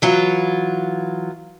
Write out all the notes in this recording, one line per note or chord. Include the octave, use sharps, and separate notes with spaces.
E3 F#3 F4